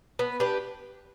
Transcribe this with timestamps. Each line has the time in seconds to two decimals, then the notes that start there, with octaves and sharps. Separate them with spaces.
0.19 B3
0.40 D4 G4 B4